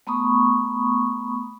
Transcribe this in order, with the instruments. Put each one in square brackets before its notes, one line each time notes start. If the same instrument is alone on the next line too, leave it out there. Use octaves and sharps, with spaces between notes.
[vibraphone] A3 B3 A#5 B5 C#6 D#6